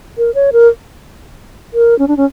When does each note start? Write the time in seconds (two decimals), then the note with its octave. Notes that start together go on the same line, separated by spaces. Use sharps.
0.18 A#4
0.35 C#5
0.53 A#4
1.73 A#4
1.99 C#4
2.08 D4
2.17 C#4